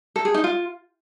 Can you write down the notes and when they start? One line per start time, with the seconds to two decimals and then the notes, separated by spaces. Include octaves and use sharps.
0.16 A4
0.25 G#4
0.34 D#4
0.44 F4